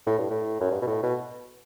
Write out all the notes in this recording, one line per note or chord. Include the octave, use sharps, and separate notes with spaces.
A2
G2
A2
F#2
G2
B2
A2
B2